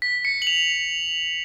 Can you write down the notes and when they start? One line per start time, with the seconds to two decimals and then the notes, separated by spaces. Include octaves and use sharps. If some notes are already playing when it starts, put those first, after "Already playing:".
0.02 B6
0.25 C#7
0.42 F#7
0.47 F7